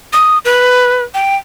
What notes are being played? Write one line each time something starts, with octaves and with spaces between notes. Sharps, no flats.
D#6
B4
G5